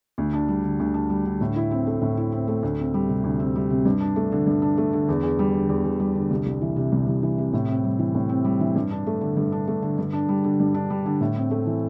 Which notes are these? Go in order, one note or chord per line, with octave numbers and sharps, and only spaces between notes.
D2
D4
G3
D3
D2
D4
G3
D3
A2
E4
C4
A3
A2
E4
C4
A3
D2
C4
G3
C3
D2
C4
G3
C3
G2
D4
A3
D3
G2
D4
A3
D3
E2
E2
G3
D3
E2
E2
G3
D3
C2
C2
E3
C3
C2
C2
E3
C3
A2
C4
G3
E3
A2
C4
G3
E3
G2
D4
A3
D3
G2
D4
A3
D3
G2
D4
G3
D3
G2
D4
G3
D3
A2
C4
A3
E3